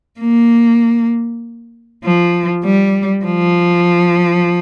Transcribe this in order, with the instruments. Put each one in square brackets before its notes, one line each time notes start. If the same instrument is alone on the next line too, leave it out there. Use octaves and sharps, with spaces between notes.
[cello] A#3
F3
G3
F3